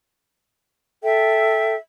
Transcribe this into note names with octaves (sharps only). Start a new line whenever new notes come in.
A4 E5 G5